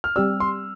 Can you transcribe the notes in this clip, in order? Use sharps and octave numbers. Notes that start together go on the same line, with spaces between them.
F6
G3 C4 G4 D5 E6
C6